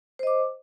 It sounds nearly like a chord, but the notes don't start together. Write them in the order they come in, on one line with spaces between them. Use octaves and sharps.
C5 D#5 D6